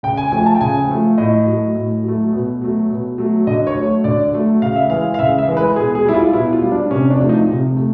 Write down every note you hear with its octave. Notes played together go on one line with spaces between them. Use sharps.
C#3 G5
G#5
F3 A3 G#5
A5
G5
C#3 G#5
F3 A3
A2 D#5
F#3 A3
A2
F#3 A3
B2
F#3 A3
B2
F#3 A3
D3 D#5
C#5
F#3 A3
D3 D5
F#3 A3
C#3 F5
E5
E3 G#3 F5
F5
C#3 E5
E5
E3 G#3
B4
B2 G#4
G#4
G3 E4
F4
B2 E4
F4
G3
D4
C3 C#4
D4
F3 A3
D#4
C3
A3